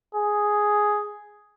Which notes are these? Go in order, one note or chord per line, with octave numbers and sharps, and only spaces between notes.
G#4